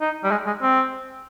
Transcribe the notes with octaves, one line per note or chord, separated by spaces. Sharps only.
D#4
G3
G#3
G#3
C4